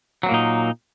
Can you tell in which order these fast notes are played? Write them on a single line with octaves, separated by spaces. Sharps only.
F#3 C4 A#3 A#2 D#4